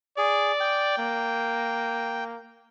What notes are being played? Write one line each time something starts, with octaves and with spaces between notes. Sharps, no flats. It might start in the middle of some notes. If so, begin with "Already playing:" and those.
G#4 D5
G5
A#3